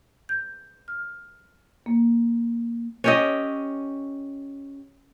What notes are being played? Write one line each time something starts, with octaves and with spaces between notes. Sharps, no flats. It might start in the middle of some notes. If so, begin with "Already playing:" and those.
G6
F6
A#3
C#4 G4 D#5